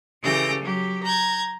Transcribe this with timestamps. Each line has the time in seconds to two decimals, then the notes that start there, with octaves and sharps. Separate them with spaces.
0.22 C#3 E3 G4 A4 G6 A#6
0.61 F#3 G4
1.04 A#5 G6 G#6